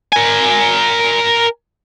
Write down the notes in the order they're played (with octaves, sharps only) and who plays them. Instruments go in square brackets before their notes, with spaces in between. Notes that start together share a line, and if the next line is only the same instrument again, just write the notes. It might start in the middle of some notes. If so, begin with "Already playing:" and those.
[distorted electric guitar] A#4 G#5